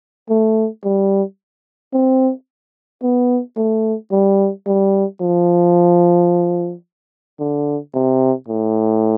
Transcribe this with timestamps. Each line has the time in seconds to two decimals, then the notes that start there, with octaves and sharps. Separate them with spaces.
0.30 A3
0.84 G3
1.93 C4
3.03 B3
3.57 A3
4.12 G3
4.67 G3
5.21 F3
7.39 D3
7.94 C3
8.48 A2